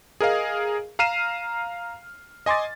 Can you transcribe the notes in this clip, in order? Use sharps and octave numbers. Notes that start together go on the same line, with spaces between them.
G#4 A#4 D#5 F5
F5 A#5 F6 C7 D#7 E7
D#5 G#5 C6 D6 A6